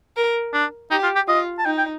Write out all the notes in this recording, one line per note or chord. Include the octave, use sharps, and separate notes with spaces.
A#4
D4
D#4 G4
F4
G4
F4 D#5
A5
D#4 G5
G5